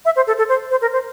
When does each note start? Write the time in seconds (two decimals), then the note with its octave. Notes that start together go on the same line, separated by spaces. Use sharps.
0.05 E5
0.16 C5
0.27 A4
0.38 A4
0.49 C5
0.71 C5
0.81 A#4
0.93 C5